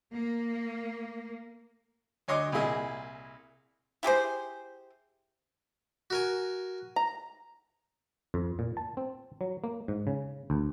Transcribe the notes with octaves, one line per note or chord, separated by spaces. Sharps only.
A#3
D2 C#5 D#5 C6 D6
C2 A#2 E4 G#4 D#5
E4 G4 G#4 C5
F#4 A#4 G#5
A#5
F2
A#2
A5
C4
F#3
A#3
G#2
C#3
D2